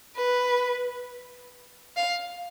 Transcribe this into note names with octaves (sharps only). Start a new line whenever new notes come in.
B4
F5